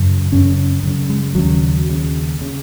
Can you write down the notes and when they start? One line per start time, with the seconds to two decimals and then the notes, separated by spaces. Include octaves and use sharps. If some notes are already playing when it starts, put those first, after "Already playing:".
Already playing: F#2 C#3
0.32 F#2 C#3 C#4
0.83 F#2 C#3
1.09 G#3
1.35 D#2 C#3 F#3
1.87 D#2 C#3
2.41 C#3